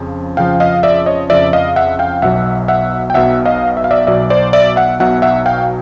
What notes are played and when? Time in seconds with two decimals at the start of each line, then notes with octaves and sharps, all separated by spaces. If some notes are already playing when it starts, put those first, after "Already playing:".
Already playing: F2 C#3 F3
0.37 F2 C#3 F3 F5 G5
0.60 D#5 F5
0.83 D5 E5
1.06 C#5 D#5
1.30 F2 C#3 F3 D5 E5
1.53 D#5 F5
1.76 E5 F#5
1.99 F5 G5
2.22 B1 B2 F#3 E5 F#5
2.68 E5 F#5
3.10 G5
3.14 B1 B2 F#3 E5 F#5
3.45 D#5 F5
3.77 E5
3.84 F5
3.91 D5 E5
4.07 B1 B2 F#3 D5 E5
4.30 C5 D5
4.53 D5 E5
4.76 E5 F#5
5.00 B1 B2 F#3 E5 F#5
5.22 E5 F#5
5.46 F5 G5